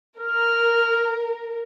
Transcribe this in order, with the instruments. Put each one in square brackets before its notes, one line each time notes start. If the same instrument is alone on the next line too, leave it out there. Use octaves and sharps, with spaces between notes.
[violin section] A#4 [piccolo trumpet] F6